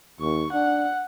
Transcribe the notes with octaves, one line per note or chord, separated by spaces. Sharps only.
D#2 C#6
D4 F#5